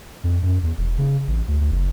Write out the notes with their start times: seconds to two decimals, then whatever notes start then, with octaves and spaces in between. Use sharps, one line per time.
0.24 F2
0.42 F#2
0.63 E2
0.78 E1
0.98 C#3
1.28 A1
1.48 D2
1.60 D2
1.71 F#1